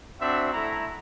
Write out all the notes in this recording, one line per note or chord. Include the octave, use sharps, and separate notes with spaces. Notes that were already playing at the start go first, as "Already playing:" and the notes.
C4 D4 F#4 E5
A3 E4 A#5